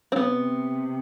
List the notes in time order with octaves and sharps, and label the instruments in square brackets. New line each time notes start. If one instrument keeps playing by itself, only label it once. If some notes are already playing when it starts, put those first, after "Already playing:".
[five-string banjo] C4
[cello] C3 [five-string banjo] B3